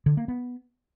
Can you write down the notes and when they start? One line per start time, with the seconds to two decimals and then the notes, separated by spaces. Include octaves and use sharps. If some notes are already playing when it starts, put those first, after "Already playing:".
0.06 D3
0.17 A#3
0.28 B3